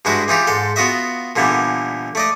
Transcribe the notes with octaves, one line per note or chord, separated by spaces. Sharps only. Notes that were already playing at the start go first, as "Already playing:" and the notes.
G2 G#3 E4 F#4 D#5
E3 D#4 F4 G4
G#2 A4 C6
B3 F4 F#4 D#5 E5
A#2 D3 E3 G3 B3
A3 D5 D#5